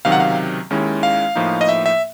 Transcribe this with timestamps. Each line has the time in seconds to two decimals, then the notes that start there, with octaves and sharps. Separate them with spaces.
0.05 C#2 C3 D#3 F#3 F5
0.12 F#5
0.20 F5
0.70 D#2 D#3 G#3 C#4 E4
1.03 F5
1.35 A2 F3 A#3 D#4
1.61 D#5
1.69 E5
1.86 E5